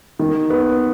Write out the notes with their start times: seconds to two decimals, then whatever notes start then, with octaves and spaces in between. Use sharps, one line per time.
0.19 D#3
0.50 B3